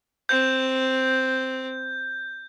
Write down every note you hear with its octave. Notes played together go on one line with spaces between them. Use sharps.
C4 G6